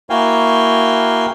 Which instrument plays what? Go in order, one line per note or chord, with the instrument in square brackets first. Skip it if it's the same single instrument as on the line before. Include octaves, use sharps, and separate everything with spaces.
[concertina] A#3 E4 F#4 F5 G5 G#5